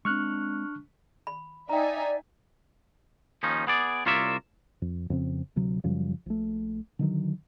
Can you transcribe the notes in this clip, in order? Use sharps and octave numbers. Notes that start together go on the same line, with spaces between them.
G#3 C4 D4 C#6 F6 F#6
B5
D#4 D5 E5 G5 G#5 A#5
D#2 F3 C#4 D#4
B3 G#4 D5
C2 F4 A#4 C#5 D5 E5
F2
F2 C#3 C4
D2 C3 F#3
F#2 C#3 F3 G3
A#1 A3
D3 D#3 F#3